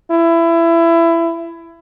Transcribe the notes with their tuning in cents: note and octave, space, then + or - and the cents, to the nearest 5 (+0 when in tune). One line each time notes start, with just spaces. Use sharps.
E4 +20